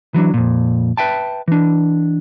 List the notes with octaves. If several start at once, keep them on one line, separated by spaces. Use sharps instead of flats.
E3 F#3 D4
F2 A#2
B4 E5 G5 A5
E3 D4